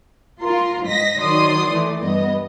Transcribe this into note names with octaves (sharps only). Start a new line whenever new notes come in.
F4 A#4 C6
G#2 D#5 A#6 B6
D#3 F#3 D5 C6 D#6
E3 A3 D5
G2 B3 D#5